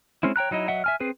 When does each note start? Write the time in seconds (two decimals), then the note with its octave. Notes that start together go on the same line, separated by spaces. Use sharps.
0.23 G#3 C4 C#4 E4
0.36 C#5 G5 A#5 F#6
0.51 F#3 D#4 E4 D#5
0.68 F#3 D#5 E5 F#5
0.84 E5 G#5 F6
1.00 C4 G#4 B4